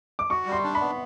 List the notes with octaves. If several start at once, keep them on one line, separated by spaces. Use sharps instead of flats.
D6
F#4 C#6
G3
C6
D4
B5
B3